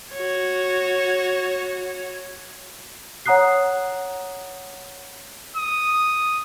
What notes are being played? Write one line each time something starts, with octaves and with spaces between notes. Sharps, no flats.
F#4 C#5
C#5 F#5 A#5 D#6 F#6 C7
D#6